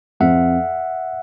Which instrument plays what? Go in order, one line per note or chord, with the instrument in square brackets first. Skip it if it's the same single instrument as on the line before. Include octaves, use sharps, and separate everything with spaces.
[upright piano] F2 [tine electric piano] E5 F#5